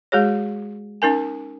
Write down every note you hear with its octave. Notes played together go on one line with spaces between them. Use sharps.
G#3 F#4 G#4 C#5
C#4 D#4 A#4 G#5